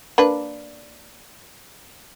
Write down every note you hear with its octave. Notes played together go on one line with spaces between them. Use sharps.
A#3 D4 B4